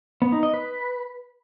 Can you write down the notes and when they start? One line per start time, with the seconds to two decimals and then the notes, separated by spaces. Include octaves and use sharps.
0.22 B3
0.32 D#4
0.43 D#5
0.54 B4